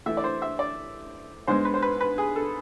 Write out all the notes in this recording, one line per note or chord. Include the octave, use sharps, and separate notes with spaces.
E3 A3 E4 E5
D5
C5
E5
D5
G#2 G#3 B3 C5
B4
C5
B4
B4
G#4
A4